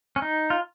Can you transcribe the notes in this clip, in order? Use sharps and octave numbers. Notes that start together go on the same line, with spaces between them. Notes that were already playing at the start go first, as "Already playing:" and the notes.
C#4
D#4
F4